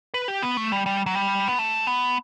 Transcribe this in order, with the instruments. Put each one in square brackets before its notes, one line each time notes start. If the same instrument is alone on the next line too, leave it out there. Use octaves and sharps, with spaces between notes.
[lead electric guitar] B4
G4
B3
A3
G3
G3
F#3
G3
B3
A3
B3